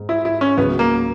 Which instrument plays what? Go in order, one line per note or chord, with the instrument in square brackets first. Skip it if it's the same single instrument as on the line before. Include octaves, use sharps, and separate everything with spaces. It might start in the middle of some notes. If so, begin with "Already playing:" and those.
Already playing: [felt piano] G#2
[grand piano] E4
E4
C#4
[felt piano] C#2 C#3 F#3 [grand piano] B3
[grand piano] A#3